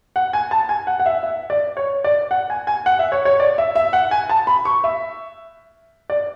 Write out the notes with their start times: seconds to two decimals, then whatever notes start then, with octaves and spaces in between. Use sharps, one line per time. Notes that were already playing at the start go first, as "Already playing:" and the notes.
0.16 F#5
0.33 G#5
0.51 A5
0.69 G#5
0.87 F#5
1.00 F#5
1.06 E5
1.23 E5
1.50 D5
1.77 C#5
2.04 D5
2.31 F#5
2.50 G#5
2.67 G#5
2.86 F#5
2.99 E5
3.12 C#5
3.25 C#5
3.40 D5
3.58 E5
3.75 E5
3.93 F#5
4.11 G#5
4.30 A5
4.47 B5
4.65 C#6
4.84 E5
6.10 D5